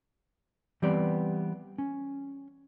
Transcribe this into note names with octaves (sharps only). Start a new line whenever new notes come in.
E3 G3 B3 C4 G4 D5
C#4